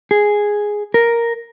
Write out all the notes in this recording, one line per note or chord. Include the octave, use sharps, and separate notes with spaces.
G#4
A#4